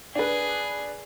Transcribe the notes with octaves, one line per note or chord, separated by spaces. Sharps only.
D4 G#4 B4